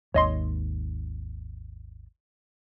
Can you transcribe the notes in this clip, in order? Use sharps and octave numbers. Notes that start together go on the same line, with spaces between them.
G#1 D#2 C#5 D#5 C6